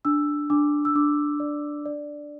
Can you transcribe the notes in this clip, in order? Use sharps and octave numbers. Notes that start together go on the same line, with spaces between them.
D4 E6
D4 D6
E6
D4 D6
D5
D5